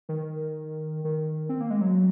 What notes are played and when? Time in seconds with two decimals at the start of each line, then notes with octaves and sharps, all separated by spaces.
0.09 D#3
1.04 D#3
1.49 C4
1.61 A#3
1.70 G#3
1.81 F#3